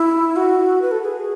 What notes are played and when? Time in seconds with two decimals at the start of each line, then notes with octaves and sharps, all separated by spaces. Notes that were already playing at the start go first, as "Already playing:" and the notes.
Already playing: E4
0.36 F#4
0.82 B4
0.91 A4
1.02 G#4